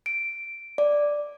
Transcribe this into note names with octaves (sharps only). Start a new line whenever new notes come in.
D7
D5